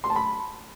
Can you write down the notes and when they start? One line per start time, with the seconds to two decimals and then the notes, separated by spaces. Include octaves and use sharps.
0.04 C6
0.10 A5
0.16 B5